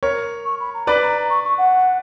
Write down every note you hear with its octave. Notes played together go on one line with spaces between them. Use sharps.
A#4 C#5
C#6
B5
A#5
B4 D5 B5
A#5
A#5
C#6
C#6
F#5